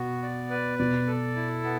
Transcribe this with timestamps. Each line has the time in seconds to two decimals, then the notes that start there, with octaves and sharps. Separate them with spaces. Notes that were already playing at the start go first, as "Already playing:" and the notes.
Already playing: B2 B3 F#4
0.22 D5
0.50 B4
0.79 B2 D5
1.07 A4
1.36 E4
1.64 B3